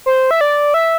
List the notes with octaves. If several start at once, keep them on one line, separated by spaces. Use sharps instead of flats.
C5
E5
D5
E5